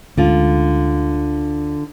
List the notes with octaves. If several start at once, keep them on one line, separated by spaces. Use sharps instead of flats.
D2 D3 G#3 C#4 F4